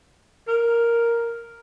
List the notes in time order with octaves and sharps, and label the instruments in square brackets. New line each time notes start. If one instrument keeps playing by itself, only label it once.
[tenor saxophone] A#4